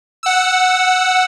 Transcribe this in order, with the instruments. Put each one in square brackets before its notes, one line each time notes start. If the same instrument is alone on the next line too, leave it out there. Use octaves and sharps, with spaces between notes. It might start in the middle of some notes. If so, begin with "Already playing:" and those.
[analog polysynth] F#5 E6